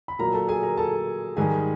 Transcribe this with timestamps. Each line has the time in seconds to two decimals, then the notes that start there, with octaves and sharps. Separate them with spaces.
0.08 B5
0.19 A#2 F#3 A#3 A#4 A#5
0.34 A4 A5
0.48 G#4 G#5
0.63 A#4 A#5
0.77 A4 A5
1.37 G#2 D#3 G3 G#4 G#5